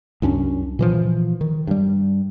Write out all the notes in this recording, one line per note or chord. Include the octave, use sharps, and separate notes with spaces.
C2 F#2 C#4 D4
A#2 E3 F3
D#3
G2 G3